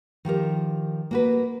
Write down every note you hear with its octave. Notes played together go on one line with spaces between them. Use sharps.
D#3 F3 G4 A#4
A#3 F#4 B4